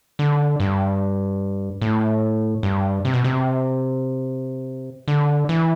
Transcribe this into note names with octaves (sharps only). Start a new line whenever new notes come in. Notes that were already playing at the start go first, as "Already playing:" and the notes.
D3
G2
A2
G2
C3
B2
C3
D3
E3